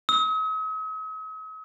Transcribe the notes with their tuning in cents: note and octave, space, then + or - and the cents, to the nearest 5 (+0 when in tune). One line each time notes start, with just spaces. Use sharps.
D#6 +45